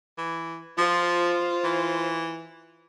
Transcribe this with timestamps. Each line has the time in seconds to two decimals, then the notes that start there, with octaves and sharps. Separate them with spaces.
0.18 E3
0.78 F3 F4 C5
1.64 E3